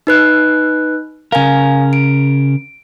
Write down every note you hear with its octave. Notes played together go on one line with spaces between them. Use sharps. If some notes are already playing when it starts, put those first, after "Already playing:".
D#4 B4 F#6
C#3 A#4 F5 G#5
D7